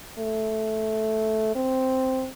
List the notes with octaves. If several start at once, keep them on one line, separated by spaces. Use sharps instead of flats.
A3
C4